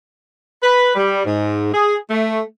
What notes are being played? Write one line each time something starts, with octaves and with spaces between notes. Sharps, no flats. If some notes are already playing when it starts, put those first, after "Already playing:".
B4
G3
G#2
G#4
A3